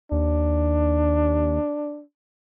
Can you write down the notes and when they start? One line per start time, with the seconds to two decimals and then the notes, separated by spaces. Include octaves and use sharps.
0.12 D#2 D4